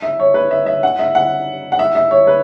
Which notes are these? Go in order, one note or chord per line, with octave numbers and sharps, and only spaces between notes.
E5
C#5
B4
E5
E5
F#5
E5
F#5
F#5
E5
E5
C#5
B4